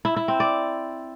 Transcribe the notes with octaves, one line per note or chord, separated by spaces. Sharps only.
E4
E4
C4
D5